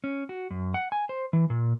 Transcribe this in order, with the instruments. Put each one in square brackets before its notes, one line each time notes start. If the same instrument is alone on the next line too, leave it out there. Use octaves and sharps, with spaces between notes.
[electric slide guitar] C#4
F#4
F#2
F#5
G#5
C5
E3
A#2